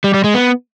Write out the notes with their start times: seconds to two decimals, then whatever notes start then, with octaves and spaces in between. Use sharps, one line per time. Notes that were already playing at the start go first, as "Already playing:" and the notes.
0.04 G3
0.14 G3
0.24 G#3
0.34 B3